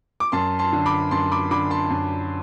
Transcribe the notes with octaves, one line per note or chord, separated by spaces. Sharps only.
D6
F#2 A5 C6
A5 C6
D3
B5 D6
F#2 A5 C6
B5 D6
D3 B5 D6
A5 C6
F#2